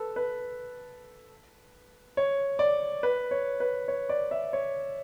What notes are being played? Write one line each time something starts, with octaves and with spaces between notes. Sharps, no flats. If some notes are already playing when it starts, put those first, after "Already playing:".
Already playing: A4 B4
B4
C#5
D5
B4
C#5
B4
C#5
D5
E5
C#5